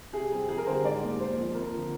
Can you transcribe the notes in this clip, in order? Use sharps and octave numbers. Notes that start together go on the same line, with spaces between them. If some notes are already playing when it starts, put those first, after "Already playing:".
C3 G#4
G3 C4
F2 G#4
A#4
D3 G3 C4 C5
G#2 D5
G3 A#3
A#2 C5
F3 A#3
F2 A#4
D3 F3